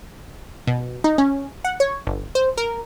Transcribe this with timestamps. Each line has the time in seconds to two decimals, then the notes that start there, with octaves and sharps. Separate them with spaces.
0.67 B2
1.04 D#4
1.18 C#4
1.64 F#5
1.80 C#5
2.07 G1
2.35 C5
2.57 A#4